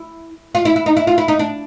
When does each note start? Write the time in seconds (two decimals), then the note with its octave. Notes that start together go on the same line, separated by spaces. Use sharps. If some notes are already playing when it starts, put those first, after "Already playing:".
Already playing: E4
0.55 F4
0.65 E4
0.76 E4
0.86 D#4
0.97 E4
1.07 F4
1.18 E4
1.28 D#4
1.39 D4